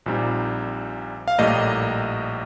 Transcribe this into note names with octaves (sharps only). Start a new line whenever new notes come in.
A#1 A#2 G3 C4 D#4
F5
A#1 A2 G3 A#3 D#5